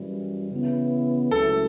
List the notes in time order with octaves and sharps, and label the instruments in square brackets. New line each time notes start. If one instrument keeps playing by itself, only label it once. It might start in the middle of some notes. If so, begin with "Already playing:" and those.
Already playing: [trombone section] F#2 E3 G3
C#3 E3 B3 E4
[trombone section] C#2 C#3 F#3 A3 E4 [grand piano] A4